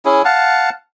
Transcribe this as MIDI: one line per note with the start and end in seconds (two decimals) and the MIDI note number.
0.05 0.22 61
0.05 0.22 64
0.05 0.22 68
0.25 0.70 77
0.25 0.70 78
0.25 0.70 81